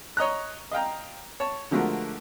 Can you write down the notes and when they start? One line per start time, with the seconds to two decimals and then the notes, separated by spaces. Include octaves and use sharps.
0.17 C#5 D#5 A#5 F#6
0.71 D#5 F5 G5 A#5
1.40 C#5 A5
1.71 D3 F3 G#3 A3 F#4 A#4